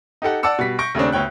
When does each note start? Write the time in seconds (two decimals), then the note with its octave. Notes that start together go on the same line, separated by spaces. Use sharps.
0.22 D#4 G4 A4 F#5
0.43 D5 F#5 A5 D6 E6 C#7
0.59 B2 G3 B6
0.79 C#6 G6 A#6 D7
0.95 D#2 C#3 A3 C4 D4
1.12 D2 B3 C#5 G5 F#6